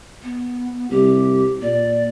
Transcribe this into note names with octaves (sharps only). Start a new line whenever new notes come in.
B3
C2 G4
A#2 D5